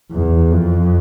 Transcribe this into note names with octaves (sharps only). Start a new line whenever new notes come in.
E2
F2